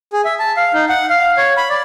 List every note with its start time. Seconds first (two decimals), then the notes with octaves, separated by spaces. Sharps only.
0.13 G#4
0.25 E5
0.39 A5
0.57 F5
0.74 D#4
0.89 F#5
1.10 F5
1.37 C#5
1.57 B5
1.70 D5